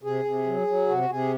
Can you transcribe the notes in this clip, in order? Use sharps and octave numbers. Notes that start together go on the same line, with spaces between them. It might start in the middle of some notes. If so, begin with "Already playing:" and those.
C3 G#4
C3
F#3
F#3
C3 F#4
C3 G#4